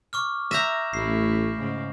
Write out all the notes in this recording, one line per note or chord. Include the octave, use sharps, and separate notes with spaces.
C#6 D6 F6
E5 A#5 G6 A#6 E7
A1 A3 C#4 E4 C7
G#2 C#3